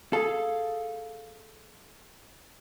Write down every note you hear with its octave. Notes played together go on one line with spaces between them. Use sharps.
G#4 A4 F5